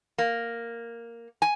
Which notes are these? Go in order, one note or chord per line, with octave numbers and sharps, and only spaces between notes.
A#3
G#5